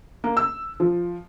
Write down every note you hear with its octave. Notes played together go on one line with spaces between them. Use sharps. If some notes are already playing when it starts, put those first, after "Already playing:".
A#3
E6
F3